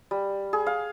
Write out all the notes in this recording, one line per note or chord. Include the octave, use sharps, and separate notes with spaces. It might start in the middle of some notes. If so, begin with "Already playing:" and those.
G3
G#4
F5